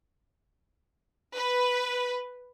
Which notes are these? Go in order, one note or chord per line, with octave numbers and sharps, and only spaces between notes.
B4